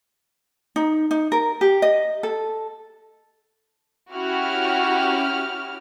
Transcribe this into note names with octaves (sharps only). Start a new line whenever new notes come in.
D#4
D#4
A#4
G4
D#5
A4
C#4 E4 F#4 G4 F6